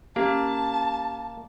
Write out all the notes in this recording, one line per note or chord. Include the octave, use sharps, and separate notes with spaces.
A#3 C#4 G4 A5